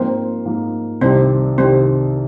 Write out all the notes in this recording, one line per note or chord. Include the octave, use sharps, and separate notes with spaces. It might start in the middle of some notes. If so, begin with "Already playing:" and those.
Already playing: G#2 F3 A#3 C4
G#2 F3 A#3
C2 C3 D#3 G3 C4
C2 C3 D#3 G3 C4